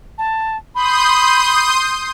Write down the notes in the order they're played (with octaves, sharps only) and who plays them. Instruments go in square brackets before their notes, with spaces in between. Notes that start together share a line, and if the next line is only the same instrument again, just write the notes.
[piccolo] A5
[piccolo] B5 [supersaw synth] C6 D#6 G6